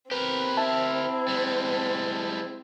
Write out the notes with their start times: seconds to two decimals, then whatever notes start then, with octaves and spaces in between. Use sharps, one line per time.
0.11 C4 G4 A#4 B4
0.57 E4 A5
1.28 G3 G#3